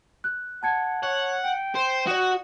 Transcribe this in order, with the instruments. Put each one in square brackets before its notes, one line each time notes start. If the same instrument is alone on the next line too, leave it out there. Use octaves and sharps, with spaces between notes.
[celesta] F#6
[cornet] F#5 [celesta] A5 G#6 C#7
[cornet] C#5 [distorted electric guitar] F#5
[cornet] G5 [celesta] C#7
[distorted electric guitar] C5
[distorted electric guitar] F#4 [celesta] D5 D#6